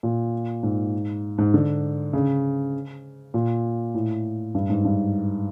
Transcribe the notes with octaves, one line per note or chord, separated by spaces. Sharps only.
A#2
G#2
G#2
D3
C#3
A#2
A2
G2
G#2
G2